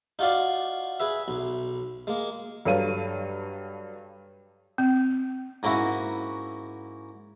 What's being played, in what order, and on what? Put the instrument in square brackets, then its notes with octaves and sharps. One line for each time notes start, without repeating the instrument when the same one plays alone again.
[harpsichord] D#4 F4 F#4 D5 F5
G#4 B4 E5
B1
G#3 A#3
[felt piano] G2 F#3 A4 C#5 F5 D#7
[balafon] C4
[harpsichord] G#2 A#3 C#4 E4 F#4